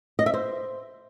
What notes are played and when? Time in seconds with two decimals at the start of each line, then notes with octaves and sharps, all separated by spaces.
0.19 D#5
0.26 E5
0.34 C5